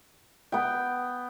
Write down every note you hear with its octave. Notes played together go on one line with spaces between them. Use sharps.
B3 G5